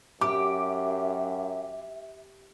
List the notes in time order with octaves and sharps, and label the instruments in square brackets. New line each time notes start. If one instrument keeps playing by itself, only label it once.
[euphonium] F#2 [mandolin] G4 [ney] E5 [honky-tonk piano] D6